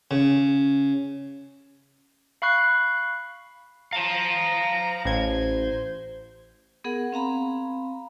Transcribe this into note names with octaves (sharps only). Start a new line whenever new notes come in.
C#3
F5 B5 C#6 F#6 C7
F5 A5 A#5
A1 C5 G#6
B3 G#4 A#4 F#5
C4 F5 A#5 B5